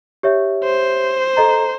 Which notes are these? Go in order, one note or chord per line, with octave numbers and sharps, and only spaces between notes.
G4 C#5 E5
C5
A4 D#5 A#5